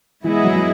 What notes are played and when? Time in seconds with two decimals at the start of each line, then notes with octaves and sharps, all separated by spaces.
0.24 E3 G#3 B3 E4 G#4 D#5
0.44 F#3
0.56 F#3